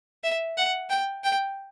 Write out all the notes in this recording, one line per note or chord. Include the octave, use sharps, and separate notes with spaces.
E5
F#5
G5
G5